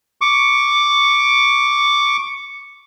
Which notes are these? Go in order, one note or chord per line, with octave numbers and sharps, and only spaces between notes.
C#6 D6